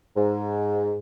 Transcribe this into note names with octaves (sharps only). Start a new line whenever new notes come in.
G#2